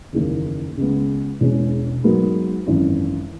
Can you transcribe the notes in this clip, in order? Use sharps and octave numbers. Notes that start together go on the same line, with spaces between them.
F#1 E2 D#3 A#3
C#2 C#3 G#3 B3
E1 E2 B2 G#3 C#4
G#2 F#3 B3 F#4 A#4
G#1 F#2 E3